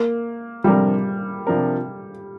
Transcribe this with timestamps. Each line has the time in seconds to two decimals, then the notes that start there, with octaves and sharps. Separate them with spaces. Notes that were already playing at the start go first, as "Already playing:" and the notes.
Already playing: A#3
0.64 C3 F3 G3 D4 A#4
1.47 C3 F3 D4 A#4